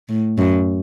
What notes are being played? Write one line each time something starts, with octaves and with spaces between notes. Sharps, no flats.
A2
F#2